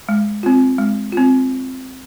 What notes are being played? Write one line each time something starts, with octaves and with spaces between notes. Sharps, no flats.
G#3
C4 F4
G#3
C4 F4